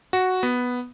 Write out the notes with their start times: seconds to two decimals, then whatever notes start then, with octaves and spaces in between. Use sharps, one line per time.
0.13 F#4
0.43 B3